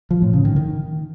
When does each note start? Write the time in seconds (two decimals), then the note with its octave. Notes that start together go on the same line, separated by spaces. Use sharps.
0.11 F3
0.22 A2
0.33 C#3
0.45 D#3
0.56 D#3